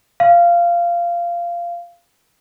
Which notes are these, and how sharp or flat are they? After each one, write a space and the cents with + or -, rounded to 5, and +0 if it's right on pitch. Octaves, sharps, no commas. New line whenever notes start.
F5 -15